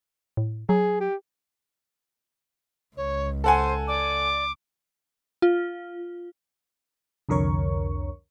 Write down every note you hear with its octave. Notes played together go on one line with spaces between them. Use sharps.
A2
F#3 G#4
G4
C#2 C#5
A4 C5 F#5 G#5
D5 D6
F4
C2 F2 D3 A#4 C#5 C#6